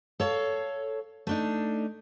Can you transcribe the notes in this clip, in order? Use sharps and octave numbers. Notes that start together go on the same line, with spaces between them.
A4 C#5 F5
A3 D4 D#4